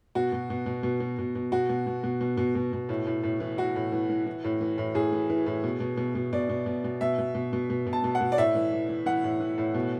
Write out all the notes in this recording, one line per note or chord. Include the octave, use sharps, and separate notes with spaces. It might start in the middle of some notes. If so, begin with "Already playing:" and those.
B2 F#4
B2
B2
B2
B2
B2
B2
B2
B2 F#4
B2
B2
B2
B2
B2
B2
B2
A2
A2
A2
E3
E3 F#4
A2
E3
E3
E3
A2
E3
A2
A2 G#4
E3
E3
A2
B2
B2
B2
B2
B2 D5
B2
B2
B2
B2 E5
B2
B2
B2
B2
B2
A5
B2
F#5
B2
D5
A2 E5
E3
E3
E3
E3 F#5
A2
E3
A2
B2